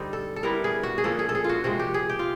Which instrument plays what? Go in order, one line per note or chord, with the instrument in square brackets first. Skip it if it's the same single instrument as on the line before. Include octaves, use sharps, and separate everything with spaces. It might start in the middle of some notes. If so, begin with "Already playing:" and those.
Already playing: [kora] D3 G3 C4 D#4
A4
A4
D3 G3 B3 E4 A#4
G#4
F#4
G#4
D3 F3 A#3 C#4 A4
G#4
A4
G#4
F4
F#4
C3 F3 G#3 F#4
G4
G#4
G4
F4